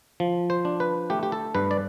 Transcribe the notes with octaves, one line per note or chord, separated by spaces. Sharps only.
F3
C5
D4
B4
A3 G4
G4
A4
G2 B4
D5